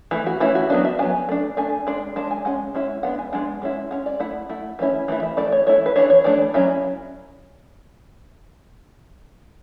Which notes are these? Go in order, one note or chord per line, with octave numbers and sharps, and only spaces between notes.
E3 A3
F#4
E3 A3 C#4 E4 F#4
F#4
F#3 B3 D4 F#4
E5
F#3 B3 D4 G#5
A3 D4
A3 D4 G#5
G#3 D4
G#3 D4 A5
G#5
G#3 C#4 F#5
G#3 C#4 E4
G#3 B3 D4 F#5
G#5
G#3 B3 D4 F#5
G#3 C#4 E4
G#3 C#4 F#5
D5
A3 E4 F#5
A3 E4
E3 A3 C#4 E4
E3 A3 E4
E5
E3 A3 E4 D5
C#5
E3 A3 E4 C#5
B4
E3 A3 D4 C#5
C#5
E3 A3 D4 D5
F#3 C#4 E4